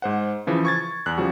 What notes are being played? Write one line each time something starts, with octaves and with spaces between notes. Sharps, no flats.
G#2 C5 F#5
C#3 E3 F3
C#6 G#6 A6
E2 F#6
C#3 F3 G3 F#4